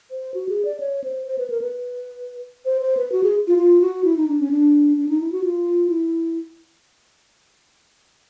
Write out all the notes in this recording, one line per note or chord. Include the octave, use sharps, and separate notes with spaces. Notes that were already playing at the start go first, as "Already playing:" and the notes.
C5
F#4
G#4
D5
C#5
C5
C5
B4
A#4
B4
C5
C5
B4
F#4
G#4
F4
F4
F#4
E4
D#4
D4
C#4
D4
D4
D#4
E4
F#4
F4
E4